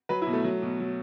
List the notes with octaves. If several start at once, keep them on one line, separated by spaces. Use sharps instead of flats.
F#3 B4
E4
B2
A3
F#3
B2
F#3